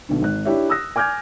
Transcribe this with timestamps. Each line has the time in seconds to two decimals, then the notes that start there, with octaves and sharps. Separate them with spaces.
0.09 B1 B2 D3
0.22 G#1 F#6
0.45 D4 E4 G4 C#5 E5
0.69 D#6 E6 F#6 A#6
0.96 G#5 D6 F6 G6 G#6